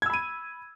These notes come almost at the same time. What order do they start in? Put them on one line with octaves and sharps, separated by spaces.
G#6 E6 B5 D#7